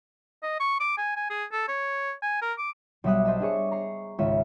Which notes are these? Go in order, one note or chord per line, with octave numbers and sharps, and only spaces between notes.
D#5
C#6
D6
G#5
G#5
G#4
A4
C#5
G#5
A#4
D6
B1 G3 E5 D#6 F#6
C5 D#5 E5 A5
D4 G4 G#4 C#5 C#6
A#5 C#6 C7
G#1 C#2 C#4 F4 C#5 E5